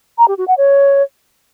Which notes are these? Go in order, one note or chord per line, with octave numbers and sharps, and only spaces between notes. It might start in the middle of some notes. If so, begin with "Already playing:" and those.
A#5
G4
F#4
F#5
C#5